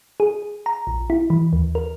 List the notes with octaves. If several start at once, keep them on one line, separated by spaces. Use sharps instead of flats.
G#4
A#5
A#1
E4
E3
D#2
A#4